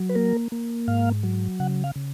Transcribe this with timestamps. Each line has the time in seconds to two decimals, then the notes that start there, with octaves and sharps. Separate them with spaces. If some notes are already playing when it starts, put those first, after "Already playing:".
Already playing: F#3
0.09 B4
0.15 A#3 A#4
0.52 A#3
0.88 G#2 F5
1.23 F#3
1.60 C#3 F#5
1.84 F5
1.96 C#3